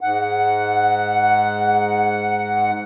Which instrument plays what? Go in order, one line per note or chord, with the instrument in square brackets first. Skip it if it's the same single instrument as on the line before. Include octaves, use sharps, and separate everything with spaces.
[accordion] G#2 F#5